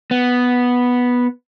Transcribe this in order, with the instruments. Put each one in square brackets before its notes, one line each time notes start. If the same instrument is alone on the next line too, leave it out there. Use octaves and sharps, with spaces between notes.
[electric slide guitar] B3